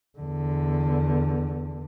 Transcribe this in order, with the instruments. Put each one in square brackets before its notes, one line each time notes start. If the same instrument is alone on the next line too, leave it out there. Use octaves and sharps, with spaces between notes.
[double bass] E2 D3